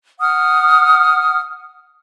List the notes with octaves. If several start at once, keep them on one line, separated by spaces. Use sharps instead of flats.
F#5 D#6 F6